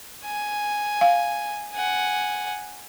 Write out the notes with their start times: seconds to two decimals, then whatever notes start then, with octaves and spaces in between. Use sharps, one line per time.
0.25 G#5
1.01 F5
1.73 F#5 G#5